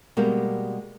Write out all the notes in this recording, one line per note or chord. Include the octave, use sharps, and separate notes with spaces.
B2 G3 G#3 A#3 G4 A#4